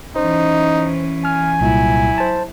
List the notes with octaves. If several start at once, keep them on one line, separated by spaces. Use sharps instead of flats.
E3 C#4 D#4 C5
G#5 F6
C2 A#2 F#3 E4
C5 A5